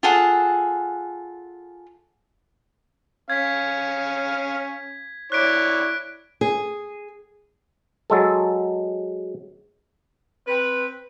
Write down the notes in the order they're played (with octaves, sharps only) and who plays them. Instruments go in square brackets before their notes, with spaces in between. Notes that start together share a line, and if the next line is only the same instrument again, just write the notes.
[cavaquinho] F4 G#4 A4 F#5
[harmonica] C#4 F5 [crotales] G#6 B6
[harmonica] E4 C#5 D5 [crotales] F#6 B6 D7
[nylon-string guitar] G#4
[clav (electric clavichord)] F#3 G#3 A4
[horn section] C4 B4